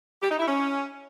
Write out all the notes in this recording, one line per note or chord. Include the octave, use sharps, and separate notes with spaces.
G4
D#4
E4
C#4